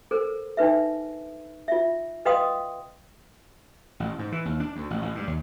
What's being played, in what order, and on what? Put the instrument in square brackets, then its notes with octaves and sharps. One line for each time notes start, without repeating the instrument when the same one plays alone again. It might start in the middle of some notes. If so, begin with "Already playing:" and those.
[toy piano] A4 A#4 C5
D4 D#4 B4 E5
F4 E5
B4 D#5 F5 G5 C6 D#6
[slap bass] A1
G#2
E3
D#2
D4
D2
A1
A1
G2
D#2